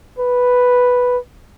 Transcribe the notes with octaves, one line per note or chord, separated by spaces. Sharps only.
B4